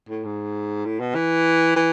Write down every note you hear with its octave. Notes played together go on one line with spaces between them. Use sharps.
A2
G#2
A2
B2
E3
E3